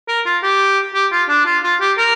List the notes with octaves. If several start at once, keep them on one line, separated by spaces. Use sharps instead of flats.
A#4
F4
G4
G4
F4
D4
F4
F4
G4
A#4